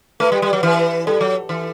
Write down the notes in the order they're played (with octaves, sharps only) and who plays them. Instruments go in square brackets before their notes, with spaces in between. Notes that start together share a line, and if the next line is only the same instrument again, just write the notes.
[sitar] A3 [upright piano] B4
[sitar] G3
G3
F#3
E3
[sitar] G3 [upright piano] A4
[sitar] F#3
E3